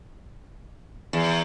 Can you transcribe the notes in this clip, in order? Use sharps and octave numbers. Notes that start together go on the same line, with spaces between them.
E2